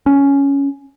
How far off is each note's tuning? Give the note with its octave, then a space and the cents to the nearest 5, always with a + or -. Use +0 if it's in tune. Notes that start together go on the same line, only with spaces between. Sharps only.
C#4 +10